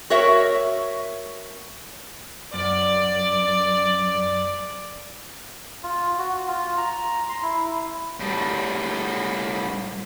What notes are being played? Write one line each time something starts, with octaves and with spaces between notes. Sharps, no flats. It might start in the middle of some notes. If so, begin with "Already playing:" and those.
F#4 A#4 C#5 E5
F#2 D5
F4
F#4
F4
A#5
C6
E4
A2 G3